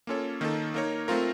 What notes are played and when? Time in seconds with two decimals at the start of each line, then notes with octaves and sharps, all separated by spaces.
0.07 A#3 C#4 F4 A4 C#5
0.41 D#3 A#3 D#4 A4
0.74 A#3 D#4 A#4 C#5
1.08 A3 C4 F4 A#4